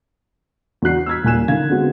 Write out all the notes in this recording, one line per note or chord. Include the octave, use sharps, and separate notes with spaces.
E2 D4 F#4 F#6 C7
E6 F6 G#6 B6
D#1 A#2 F4 G#5 F#6 E7
D3 D#3 F5 G#6
D3 G#3 B3 C4 F#4